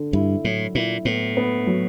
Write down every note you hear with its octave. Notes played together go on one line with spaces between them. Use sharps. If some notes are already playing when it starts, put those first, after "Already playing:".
Already playing: D3
G2 E4
A2 F#3
A#2 E4
A2 B3
B3
F#3